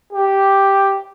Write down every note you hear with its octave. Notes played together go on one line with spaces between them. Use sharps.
G4